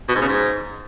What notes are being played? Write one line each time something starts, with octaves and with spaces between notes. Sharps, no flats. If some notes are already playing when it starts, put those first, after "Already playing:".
B2
G#2
C#3
G#2